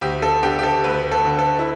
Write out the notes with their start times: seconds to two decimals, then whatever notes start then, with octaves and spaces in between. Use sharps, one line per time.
0.01 D2 G4
0.22 A4
0.43 D3 G4
0.59 G4
0.63 A4
0.84 D2 B4
1.11 A4
1.25 D3
1.39 A4
1.59 E4